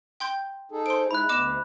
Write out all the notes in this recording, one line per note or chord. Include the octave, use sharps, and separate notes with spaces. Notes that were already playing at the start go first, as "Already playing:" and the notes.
G5 C6 G6
D#4 G#4 A4
C5 C6 D7
G#3 D#4 E4 B5 F#6
D2 B3 D#5 D6 E7